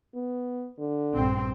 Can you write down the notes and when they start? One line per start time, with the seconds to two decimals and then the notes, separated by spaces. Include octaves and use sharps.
0.15 B3
0.78 D3
1.15 A#1 G2 C4